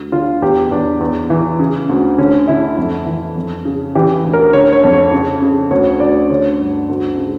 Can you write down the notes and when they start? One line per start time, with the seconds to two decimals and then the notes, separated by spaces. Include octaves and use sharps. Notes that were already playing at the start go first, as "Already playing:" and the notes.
Already playing: D2
0.12 D3 F4
0.42 E2 G4
0.71 E2 D4
1.00 E2
1.30 E3
1.59 C#3
1.89 D2
2.18 D3 C#4
2.48 D3 E4
2.77 F2
3.06 E3
3.36 F2
3.65 C#3
3.95 E3 G4
4.24 D2
4.33 A#4
4.53 D3 C#5
4.73 C#5
4.83 F2
4.93 C#5
5.12 C#3
5.42 C#3
5.71 D2 C#5
6.00 D2 D5
6.30 D3 C#5
6.59 G2
6.89 D2
7.17 C#3